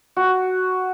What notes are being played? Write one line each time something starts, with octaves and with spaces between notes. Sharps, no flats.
F#4